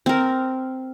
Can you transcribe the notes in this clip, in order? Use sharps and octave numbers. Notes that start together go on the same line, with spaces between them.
C4 A#4